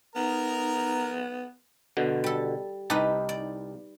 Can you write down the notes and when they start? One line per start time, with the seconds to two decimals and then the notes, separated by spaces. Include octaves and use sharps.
0.16 B3 D#4 A#4 A#5
1.97 B2 D3
2.24 G3 A4
2.90 C2 D#4 G4 B4 A5
3.29 D5